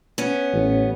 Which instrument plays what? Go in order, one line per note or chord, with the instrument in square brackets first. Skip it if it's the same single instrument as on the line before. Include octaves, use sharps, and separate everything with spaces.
[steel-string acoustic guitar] B3 C#4
[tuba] A1